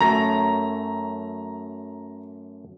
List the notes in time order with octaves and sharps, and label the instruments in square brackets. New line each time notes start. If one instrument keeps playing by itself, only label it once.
[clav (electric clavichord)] F#2 A3 C#5 [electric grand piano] A#5 A#6